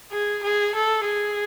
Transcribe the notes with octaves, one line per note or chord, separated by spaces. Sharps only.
G#4
G#4
A4
G#4